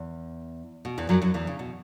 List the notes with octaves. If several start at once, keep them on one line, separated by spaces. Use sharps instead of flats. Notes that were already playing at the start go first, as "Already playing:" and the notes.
Already playing: E2
B2
E2 E3
F#2 F#3
F#2 F#3
E2 E3
C#3
B2